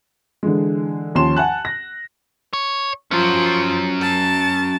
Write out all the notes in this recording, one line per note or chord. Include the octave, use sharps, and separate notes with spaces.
D3 E3 G#3
D#2 F3 C#4 A5 C6 E7
F#5 G#5 A5 F#6
A#6
C#5
F3 F#3 C#4 F4
A5